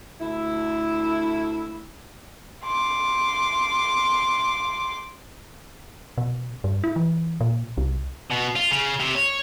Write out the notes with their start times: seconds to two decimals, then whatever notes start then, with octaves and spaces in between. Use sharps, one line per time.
0.20 D2 E4
2.64 C6 D6
6.18 B2
6.64 G2
6.84 E4
6.96 E3
7.41 A#2
7.77 C2
8.31 B2
8.56 F4
8.71 C#3
9.00 C3
9.15 C#5